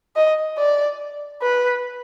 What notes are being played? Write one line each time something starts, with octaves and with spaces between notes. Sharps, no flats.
D#5
D5
B4